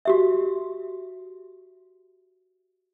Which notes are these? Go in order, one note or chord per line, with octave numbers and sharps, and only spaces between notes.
F#4 G4 E5